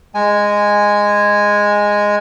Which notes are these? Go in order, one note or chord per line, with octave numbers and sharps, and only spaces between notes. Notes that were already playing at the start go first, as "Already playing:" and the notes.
G#3 G#5